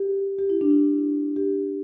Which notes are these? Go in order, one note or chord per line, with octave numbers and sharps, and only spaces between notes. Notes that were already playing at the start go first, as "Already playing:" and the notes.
Already playing: G4
G4
E4
D4
E4
G4